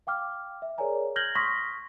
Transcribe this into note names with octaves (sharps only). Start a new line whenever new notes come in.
F5 G5 D6 F6
E5
G#4 A#4 C#5 D5 G#5 A#5
F6 G6 G#6 A#6 F#7 G7
C6 C#6 D#6 F6 A#6 B6